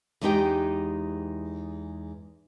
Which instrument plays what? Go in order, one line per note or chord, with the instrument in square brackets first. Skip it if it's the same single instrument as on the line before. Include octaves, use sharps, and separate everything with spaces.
[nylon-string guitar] E2 G#3 B3 D#4 G4 G5